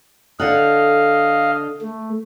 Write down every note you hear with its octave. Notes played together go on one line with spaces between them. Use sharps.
D3 A4 D#5 F5 F#5
A3